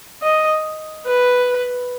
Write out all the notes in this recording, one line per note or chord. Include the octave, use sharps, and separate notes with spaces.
D#5
B4